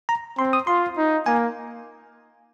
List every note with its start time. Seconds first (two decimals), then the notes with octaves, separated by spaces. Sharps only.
0.09 A#5
0.38 C4 C6
0.53 D#6
0.67 F4 C6
0.97 D#4
1.26 A#3 G#5